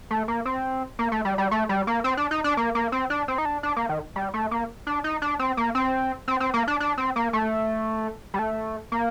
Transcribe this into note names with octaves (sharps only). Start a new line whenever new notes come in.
A3
A#3
C4
A#3
A3
G3
G3
A3
G3
A#3
C4
D4
D#4
D4
A#3
A#3
C4
D4
C4
D#4
D4
D4
A#3
D#3
G3
A3
A#3
D4
D#4
D4
C4
A#3
C4
C4
C4
A#3
D4
D4
C4
A#3
A3
G3
A3
A#3